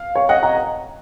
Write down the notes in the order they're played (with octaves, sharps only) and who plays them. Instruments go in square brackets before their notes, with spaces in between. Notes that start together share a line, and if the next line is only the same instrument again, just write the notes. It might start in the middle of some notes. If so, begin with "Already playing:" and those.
Already playing: [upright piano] F5
C#5 F5
D#5 F#5
F#5 A#5